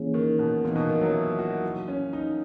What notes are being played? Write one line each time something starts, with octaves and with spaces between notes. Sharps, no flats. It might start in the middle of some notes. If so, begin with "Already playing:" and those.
Already playing: E3 A#3 C#4 G#4
D#3
B2
A#2 E3 B3 D#4
B2
D#3
F#3
E4
F#4
F#3 B3 E4 A#4
C#4
D#4